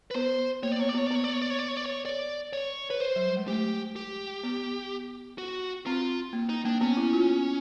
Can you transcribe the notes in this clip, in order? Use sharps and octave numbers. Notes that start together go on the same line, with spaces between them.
B4
B3 C5
A#3 C#5
D5
B3 C#5
D5
B3 C#5
D5
B3 C#5
D5
C#5
D5
C#5
D5
C#5
D5
C#5
D5
C#5
B4
C5
F#3
G3
G#3
A3 G4
G4
B3
F#4
C4 F4
A#3
D#4
A#3 D4
B3 C#4
E4
F4